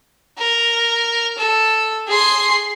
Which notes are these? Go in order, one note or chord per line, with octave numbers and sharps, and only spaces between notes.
A#4
A4
G#4 C6